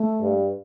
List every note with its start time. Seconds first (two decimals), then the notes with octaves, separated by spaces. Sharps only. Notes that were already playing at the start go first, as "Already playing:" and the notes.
Already playing: A3
0.21 G2